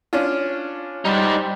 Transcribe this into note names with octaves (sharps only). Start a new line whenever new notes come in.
C#4 D4 F4
G3 D#4 C5